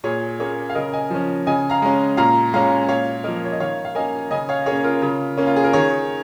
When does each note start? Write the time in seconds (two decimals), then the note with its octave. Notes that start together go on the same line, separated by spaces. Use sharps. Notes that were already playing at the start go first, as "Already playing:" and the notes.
0.04 A#2 G#4 C#5
0.39 A#3 C#4 G#4 C#5
0.69 F5
0.75 C#3 A#4 D#5
0.93 D#5 G#5
1.10 F3 C#4
1.46 C#3 D#5 G#5
1.70 F5 A#5
1.82 G#3 C#4
2.17 A#2 F5 A#5
2.53 G#3 C#4 F5 A#5
2.88 A#2 C#5 F5
3.24 F3 A#3 A#4 D#5
3.45 C#5
3.52 D#5
3.60 D#3 C#5 F5
3.85 F5
3.95 A#3 C#4 D#5 G#5
4.31 C#3 D#5 G#5
4.49 C#5 F5
4.66 A#3 C#4 G#4 C#5
4.84 F4 A#4
5.02 C#3
5.38 A#3 C#4
5.47 F4
5.56 G#4
5.64 A#4
5.73 D#3 G#4 C#5